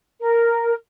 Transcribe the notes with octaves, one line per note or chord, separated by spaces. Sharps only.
A#4